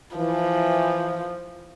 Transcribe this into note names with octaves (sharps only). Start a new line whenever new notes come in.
E3 F3